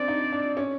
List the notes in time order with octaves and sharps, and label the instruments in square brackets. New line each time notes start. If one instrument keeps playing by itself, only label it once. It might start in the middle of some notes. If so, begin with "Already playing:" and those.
Already playing: [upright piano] C4 D4 [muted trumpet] D5
[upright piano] D#4
D4
C#4